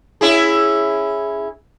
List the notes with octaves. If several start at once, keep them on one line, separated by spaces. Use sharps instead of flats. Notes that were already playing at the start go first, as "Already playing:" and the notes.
C#4 E4 G#4